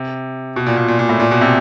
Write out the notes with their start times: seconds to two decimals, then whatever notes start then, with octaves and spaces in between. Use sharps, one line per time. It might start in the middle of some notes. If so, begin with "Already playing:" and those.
Already playing: C3
0.56 B2
0.66 A#2
0.77 A#2
0.88 A#2
0.99 A#2
1.09 A2
1.20 A#2
1.31 B2
1.41 C3